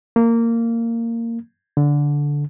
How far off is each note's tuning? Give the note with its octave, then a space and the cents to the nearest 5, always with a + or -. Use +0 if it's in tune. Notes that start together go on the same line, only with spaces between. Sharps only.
A#3 -15
D3 -15